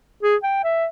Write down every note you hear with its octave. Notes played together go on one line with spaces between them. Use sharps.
G#4
G5
E5